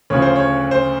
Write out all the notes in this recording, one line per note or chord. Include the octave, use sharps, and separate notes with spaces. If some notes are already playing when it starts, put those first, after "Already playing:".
D2 C#3 F3 C#5
C5
C#5
C5